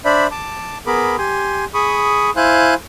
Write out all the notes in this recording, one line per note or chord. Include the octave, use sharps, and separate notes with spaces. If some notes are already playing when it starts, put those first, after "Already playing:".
D4 C5 D5 E5 B5
A5 D6
B3 G#4 A#4 B5 D6
G4 G#5 C6
G#4 B5 C#6 D#6
E4 C5 F5 G#5 C6 F#6